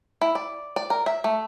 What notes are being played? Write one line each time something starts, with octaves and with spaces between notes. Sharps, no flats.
E4
D5
D5
A#4
E5
A3